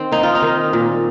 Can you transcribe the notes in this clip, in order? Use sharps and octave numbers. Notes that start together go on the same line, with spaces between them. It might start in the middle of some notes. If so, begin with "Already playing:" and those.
Already playing: D#3 C4
A#3 D#4
F4
D#4
D#3
A#2